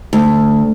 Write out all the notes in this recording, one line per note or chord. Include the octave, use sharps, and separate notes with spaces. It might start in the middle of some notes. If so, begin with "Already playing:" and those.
D2